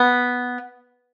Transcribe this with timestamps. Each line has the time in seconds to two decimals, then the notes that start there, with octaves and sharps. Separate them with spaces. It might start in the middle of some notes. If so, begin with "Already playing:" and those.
Already playing: B3